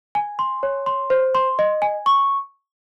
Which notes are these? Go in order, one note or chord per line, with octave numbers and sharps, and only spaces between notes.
G#5
C6
C#5
C6
C5
C6
D#5
G#5
C#6